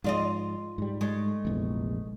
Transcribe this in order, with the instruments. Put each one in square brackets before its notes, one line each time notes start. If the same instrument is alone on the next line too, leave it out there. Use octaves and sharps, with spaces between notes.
[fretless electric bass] G#2 F3 G#3 [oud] F4 D5 D#5
[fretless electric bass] G#2 G3
[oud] G#3 A3
[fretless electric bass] F1 A#1 E2